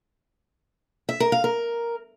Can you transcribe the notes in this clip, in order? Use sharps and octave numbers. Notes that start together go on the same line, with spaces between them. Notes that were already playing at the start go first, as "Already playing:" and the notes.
E5
A#4
F5
A#4